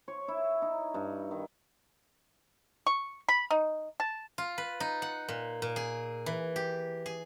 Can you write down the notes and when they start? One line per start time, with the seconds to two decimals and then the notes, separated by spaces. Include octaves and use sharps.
0.08 C#5
0.28 E4
0.62 D#4
0.94 G2
1.31 D#3
2.87 C#6
3.29 B5
3.51 D#4
4.00 A5
4.38 F4
4.58 B4
4.80 D#4
5.02 F#5
5.28 A#2
5.62 A#2
5.76 G#4
6.26 E3
6.56 G4
7.06 G#4